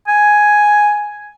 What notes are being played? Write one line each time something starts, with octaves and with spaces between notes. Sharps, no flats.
G#5